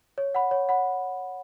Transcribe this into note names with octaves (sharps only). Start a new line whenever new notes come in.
C#5
F#5 B5
C#5
F#5 B5